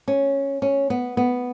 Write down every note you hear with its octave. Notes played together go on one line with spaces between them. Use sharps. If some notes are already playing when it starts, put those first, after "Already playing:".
C#4
C#4
B3
B3